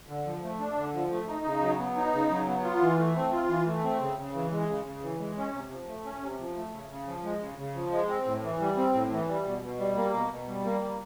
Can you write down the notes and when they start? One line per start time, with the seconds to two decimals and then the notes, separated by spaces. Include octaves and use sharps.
0.08 D3
0.26 F3
0.43 A3
0.60 D4
0.78 D3
0.94 F3
1.11 A3
1.28 D#4
1.45 C#3
1.62 F#3
1.79 B3
1.97 D#4
2.13 C#3
2.31 F#3
2.47 B3
2.64 F4
2.82 E3
2.99 A3
3.15 C4
3.32 F4
3.49 E3
3.67 A3
3.84 C4
4.01 C#3
4.18 C#3
4.34 E3
4.51 G#3
4.69 C#3
4.86 C#3
5.03 E3
5.20 G#3
5.37 C#4
5.53 C3
5.71 F3
5.88 A3
6.04 C#4
6.22 C3
6.39 F3
6.56 A3
6.73 C#3
6.90 C#3
7.07 F3
7.24 G#3
7.40 C#3
7.58 C#3
7.75 F3
7.92 G#3
8.09 C4
8.26 A2
8.43 E3
8.60 G3
8.77 C4
8.94 A2
9.11 E3
9.28 G3
9.45 B2
9.63 B2
9.79 G3
9.97 A#3
10.14 B2
10.30 B2
10.48 G3
10.65 A#3
10.82 G3